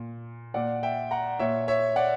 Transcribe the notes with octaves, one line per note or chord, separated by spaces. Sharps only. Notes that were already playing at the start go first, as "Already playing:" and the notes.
Already playing: A#2
A#2 D5 F#5
E5 G5
F#5 A#5
A#2 C#5 E5
C#5 E5
D5 F#5